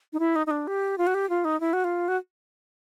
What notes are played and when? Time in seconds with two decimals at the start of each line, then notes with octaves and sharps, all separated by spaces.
0.13 D#4
0.20 E4
0.36 D#4
0.47 D#4
0.51 D4
0.67 G4
0.98 F4
1.07 F#4
1.14 G4
1.30 F4
1.45 D#4
1.60 E4
1.73 F#4
1.84 F4
2.08 F#4